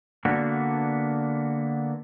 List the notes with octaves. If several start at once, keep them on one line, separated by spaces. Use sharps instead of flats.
D3 A#3 B3 D4 F#4